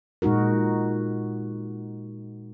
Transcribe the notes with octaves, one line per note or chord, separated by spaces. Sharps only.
A#2 G#3 D#4 F#4 A#4